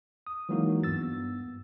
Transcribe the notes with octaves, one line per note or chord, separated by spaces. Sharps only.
D#6
E3 F#3 G#3 A#3 D#4 F#4
G2 B3 E6 A6